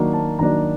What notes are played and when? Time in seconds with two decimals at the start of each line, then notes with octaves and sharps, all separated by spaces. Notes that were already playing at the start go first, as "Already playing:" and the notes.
Already playing: D#3 F#3 A#3 D4
0.13 A5
0.39 D#3 F#3 A#3 D4 A#5